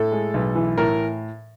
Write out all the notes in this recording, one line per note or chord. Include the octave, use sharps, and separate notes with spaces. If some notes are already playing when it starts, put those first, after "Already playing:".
Already playing: A2 A4
G#3
B1
E3
A2 A#4